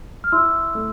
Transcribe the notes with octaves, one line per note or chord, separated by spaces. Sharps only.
F6
E4 C6 E6
A3